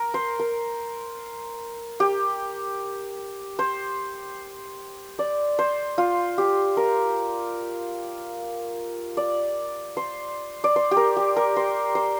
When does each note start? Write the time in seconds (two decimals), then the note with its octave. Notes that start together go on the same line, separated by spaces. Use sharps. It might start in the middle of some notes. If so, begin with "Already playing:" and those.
Already playing: A#4
0.14 C5
0.39 A#4
2.00 G4
3.59 C5
5.19 D5
5.59 C5
5.98 F4
6.38 G4
6.77 A#4
9.17 D5
9.97 C5
10.64 D5
10.76 C5
10.91 G4
10.97 A#4
11.17 G4
11.36 A#4
11.56 C5
11.95 C5